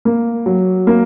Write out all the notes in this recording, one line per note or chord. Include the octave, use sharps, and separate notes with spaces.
A#3
F#3
A#3